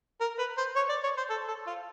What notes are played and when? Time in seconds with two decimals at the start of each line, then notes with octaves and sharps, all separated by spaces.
0.21 A#4
0.38 B4
0.58 C5
0.76 C#5
0.89 D5
1.03 C#5
1.17 C5
1.30 A4
1.48 A4
1.67 F4